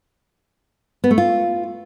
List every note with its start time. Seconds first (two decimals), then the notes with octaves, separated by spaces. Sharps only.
1.04 B3
1.11 A3
1.18 F4